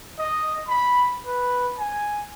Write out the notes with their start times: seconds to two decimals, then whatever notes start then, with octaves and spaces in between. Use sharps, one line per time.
0.19 D#5
0.68 B5
1.26 B4
1.79 G#5